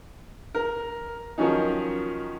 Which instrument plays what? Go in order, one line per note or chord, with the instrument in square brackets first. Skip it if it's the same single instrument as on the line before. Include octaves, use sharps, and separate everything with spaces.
[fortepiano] A#4
D#3 F3 F#3 C#4 D#4